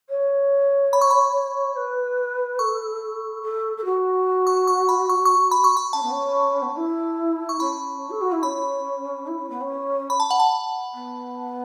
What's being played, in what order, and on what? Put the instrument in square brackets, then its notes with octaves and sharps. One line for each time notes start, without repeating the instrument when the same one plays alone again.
[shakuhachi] C#5
[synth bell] B5
C#6
B5
[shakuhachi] B4
[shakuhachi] A4 [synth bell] C#6
[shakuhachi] A4
A4
F#4
[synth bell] C#6
C#6
B5
C#6
C#6
B5
C#6
B5
[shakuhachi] C#4 [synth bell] A5
[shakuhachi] B3
C#4
B3
C#4
E4
[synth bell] C#6
[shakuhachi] C#4 [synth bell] B5
[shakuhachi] A4
F#4
E4
[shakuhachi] C#4 [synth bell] B5
[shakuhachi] E4
C#4
B3
C#4
[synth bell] B5
A5
F#5
A5
[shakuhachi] B3